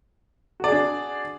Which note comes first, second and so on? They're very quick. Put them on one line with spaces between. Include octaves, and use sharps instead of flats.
F#4 D5 G#4 D4